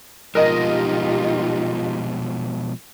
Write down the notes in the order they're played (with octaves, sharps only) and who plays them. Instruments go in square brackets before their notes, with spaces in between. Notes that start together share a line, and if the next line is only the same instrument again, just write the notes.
[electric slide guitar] B2 F3 G#3 [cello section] D#4 F4 G4 [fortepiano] A#4 D#5